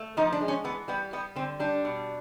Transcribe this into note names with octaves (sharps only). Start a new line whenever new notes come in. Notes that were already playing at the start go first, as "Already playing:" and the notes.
Already playing: A3
F3 D#4
D4
G#3
C#4
E3 B3
G3 B3
G3 B3
D3 C4
G3 D4
B2